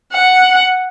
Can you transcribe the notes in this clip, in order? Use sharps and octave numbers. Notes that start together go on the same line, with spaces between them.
F#5